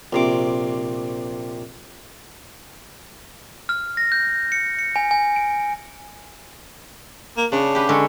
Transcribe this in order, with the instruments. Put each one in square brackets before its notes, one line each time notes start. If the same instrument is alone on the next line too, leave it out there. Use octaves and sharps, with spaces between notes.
[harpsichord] A#1 C3 D6
[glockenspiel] F6
A#6
G6
C#7
C#7
G#5
G#5
D7
[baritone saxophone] A#3
[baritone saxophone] C#3 [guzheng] D4
[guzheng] G4 B4
D3 G#3 C#4